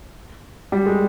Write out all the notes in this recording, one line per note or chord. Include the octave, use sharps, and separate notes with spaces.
G3
G#3